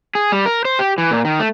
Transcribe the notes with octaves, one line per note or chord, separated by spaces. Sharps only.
G#4
G3
A#4
C5
G4
E3
A#2
D#3
A3